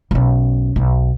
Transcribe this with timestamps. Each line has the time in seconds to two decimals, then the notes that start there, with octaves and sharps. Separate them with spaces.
0.11 B1 C#4
0.76 B1